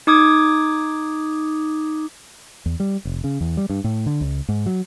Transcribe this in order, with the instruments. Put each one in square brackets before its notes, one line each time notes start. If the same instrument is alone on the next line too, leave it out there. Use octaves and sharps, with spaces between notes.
[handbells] D#4 D6 D#6 G#6
[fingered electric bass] E2
G3
F1
C#3
E2
G3
G2
A2
D3
C#2
G#2
F#3